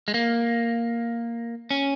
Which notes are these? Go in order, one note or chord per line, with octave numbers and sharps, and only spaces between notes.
G#3
A#3
C#4